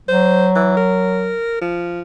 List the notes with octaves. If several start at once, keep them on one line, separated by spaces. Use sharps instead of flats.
F#3 C5
E3
A#4
F3